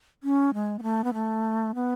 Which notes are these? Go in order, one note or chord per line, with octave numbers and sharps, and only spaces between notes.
C#4
G#3
B3
A3
B3
A3
B3